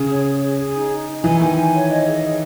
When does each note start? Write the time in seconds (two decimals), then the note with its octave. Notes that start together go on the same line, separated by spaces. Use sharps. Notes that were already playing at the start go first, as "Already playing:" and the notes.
Already playing: C#3 G#4
0.09 C#5
0.25 C#5
0.42 G#4
0.58 G#4
0.74 D#4
0.91 D#4
1.07 D#4
1.23 E3 G#5
1.40 D#3 G#5
1.56 G#5
1.73 C#5
1.90 D#5
2.05 G#4
2.22 G#4